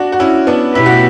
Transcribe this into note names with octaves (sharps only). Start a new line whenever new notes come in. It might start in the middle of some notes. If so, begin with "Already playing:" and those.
Already playing: D4 F#4
F#4
C#4 E4
B3 D4
B2 A3 C#4 E4 G4 B4
F#4